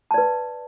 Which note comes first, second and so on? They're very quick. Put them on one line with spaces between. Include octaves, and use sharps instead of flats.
A5 D5 B4